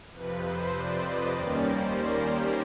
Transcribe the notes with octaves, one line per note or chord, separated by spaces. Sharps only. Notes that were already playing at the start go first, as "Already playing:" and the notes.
F2 C3 F3 B4
C5
D5
D#5
D#2 D#3 G3 A#3 C#4 D5
C5
A#4
G4